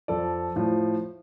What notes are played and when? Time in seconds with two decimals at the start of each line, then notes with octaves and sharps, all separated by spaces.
0.08 F2 F3 A4 D5
0.56 A2 F3